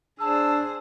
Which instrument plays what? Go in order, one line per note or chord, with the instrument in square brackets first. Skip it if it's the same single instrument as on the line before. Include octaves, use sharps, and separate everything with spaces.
[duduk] D4 [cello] G#4 C5 [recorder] A5 [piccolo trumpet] E6